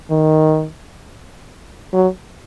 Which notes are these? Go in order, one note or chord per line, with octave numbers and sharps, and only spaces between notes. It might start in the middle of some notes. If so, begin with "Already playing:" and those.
D#3
F#3